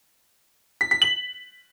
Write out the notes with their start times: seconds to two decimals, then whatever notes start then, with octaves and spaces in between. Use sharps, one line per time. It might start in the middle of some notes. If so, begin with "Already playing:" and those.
0.81 B6
0.91 B6
1.02 F#7